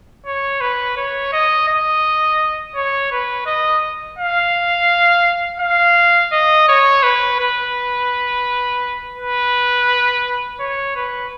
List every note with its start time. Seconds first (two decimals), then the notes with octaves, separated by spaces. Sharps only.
0.26 C#5
0.61 B4
0.97 C#5
1.33 D#5
1.68 D#5
2.75 C#5
3.12 B4
3.46 D#5
4.19 F5
5.60 F5
6.32 D#5
6.68 C#5
7.03 B4
7.39 B4
9.18 B4
10.60 C#5
10.96 B4